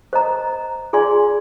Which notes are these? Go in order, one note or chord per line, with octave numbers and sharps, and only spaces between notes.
C5 D#5 A#5
F4 G#4 D5 G#5 C6